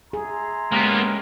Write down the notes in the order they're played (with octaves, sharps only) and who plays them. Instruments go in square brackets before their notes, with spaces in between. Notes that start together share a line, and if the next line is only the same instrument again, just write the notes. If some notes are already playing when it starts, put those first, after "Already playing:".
[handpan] G#4 [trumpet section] E5 A#5 C6
[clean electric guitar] G#3 C#4 G4 [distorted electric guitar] A#3 B3